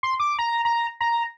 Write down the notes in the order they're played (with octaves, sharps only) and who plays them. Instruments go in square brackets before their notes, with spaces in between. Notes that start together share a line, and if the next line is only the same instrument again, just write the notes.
[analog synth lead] C6
D6
A#5
A#5
A#5